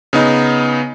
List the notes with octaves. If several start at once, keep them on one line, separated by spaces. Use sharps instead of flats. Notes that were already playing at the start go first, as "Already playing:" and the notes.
C#3 B3 D#4